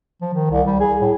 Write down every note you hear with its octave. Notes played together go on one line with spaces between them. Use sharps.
F3
D#3
C2
G3
G#4
A2